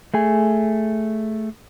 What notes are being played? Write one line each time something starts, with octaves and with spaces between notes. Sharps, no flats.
A3 G#4 G#5